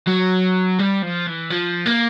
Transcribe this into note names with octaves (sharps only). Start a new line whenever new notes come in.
F#3
G3
F3
E3
F3
A#3